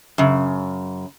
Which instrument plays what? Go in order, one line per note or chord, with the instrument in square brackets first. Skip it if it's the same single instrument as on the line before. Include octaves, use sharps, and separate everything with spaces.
[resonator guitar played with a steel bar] F#2 C#3